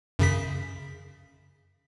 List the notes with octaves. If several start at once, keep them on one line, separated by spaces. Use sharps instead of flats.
F#2 C#3 B6